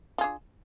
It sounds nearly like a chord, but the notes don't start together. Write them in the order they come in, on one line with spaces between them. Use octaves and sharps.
F4 G#4 D4